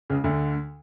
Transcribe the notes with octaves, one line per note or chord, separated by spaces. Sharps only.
C#2 C#3
D2 D3